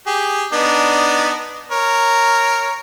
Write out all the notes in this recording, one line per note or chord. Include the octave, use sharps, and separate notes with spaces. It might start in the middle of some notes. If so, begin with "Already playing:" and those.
G4 G#4
B3 D4 D#4
A#4 C#5